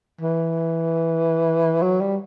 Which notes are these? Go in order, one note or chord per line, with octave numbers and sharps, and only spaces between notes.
E3
F#3
G3